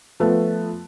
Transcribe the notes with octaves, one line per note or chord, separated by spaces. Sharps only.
F3 A3 B3